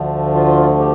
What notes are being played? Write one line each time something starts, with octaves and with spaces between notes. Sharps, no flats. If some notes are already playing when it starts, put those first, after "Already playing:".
Already playing: D2 D3 F3 A3
F4
G4